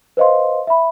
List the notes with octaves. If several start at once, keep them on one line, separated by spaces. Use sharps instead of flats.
B4 C5 D#5 F5 C6
E5 B5